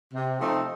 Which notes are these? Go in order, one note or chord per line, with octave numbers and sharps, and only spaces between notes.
C3
F3 A3 C4 D#4